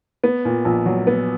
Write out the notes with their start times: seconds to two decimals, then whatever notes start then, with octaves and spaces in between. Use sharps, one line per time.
0.24 B3
0.45 A#2
0.65 A#1
0.86 F#3
1.07 B3